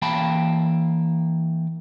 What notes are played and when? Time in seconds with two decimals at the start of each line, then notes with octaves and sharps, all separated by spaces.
0.02 E3 A#3 F5 G5 A5 B5